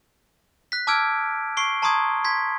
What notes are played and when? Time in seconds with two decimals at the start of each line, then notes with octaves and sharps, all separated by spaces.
0.72 F#6 B6
0.87 A5 D6 E6 F6 G#6 D7
1.57 C#6 C7 D7 G7
1.82 A5 A#5 C6 C#6 D#6 G#6
2.24 C6 G#6 B6